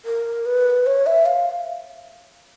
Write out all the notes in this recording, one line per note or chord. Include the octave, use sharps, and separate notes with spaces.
A#4
B4
C#5
E5
F5